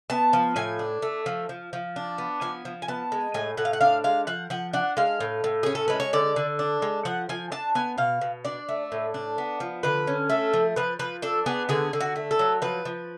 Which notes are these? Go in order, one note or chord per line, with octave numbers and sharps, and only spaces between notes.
B3 A5
F3
A2 G#5
D4
A3
F3
F3
F3
D4
B3
F3 G#5
F3
G#5
B3 A5
G#3
A2 G#5
A2 F#5
F5
F#5
D4 F5
G#3 F5
F3 F#5
F3 F#5
D4 F#5
G#3 F5
A2
A2
C#4 G#4
A4
G#3 B4
C#5
D3 D5
D3
D4
G#3
F3 F#5
F3 G#5
D4 A5
B3 G#5
B2 F5
B2
D4 D5
A3
A2
D4
B3
F3
D3 B4
C#4
A3 A4
F3
F3 B4
F3 B4
D4 A4
B3 G#4
D3 G#4
D3
F#4
A3
A4
F#3
F3 B4
F3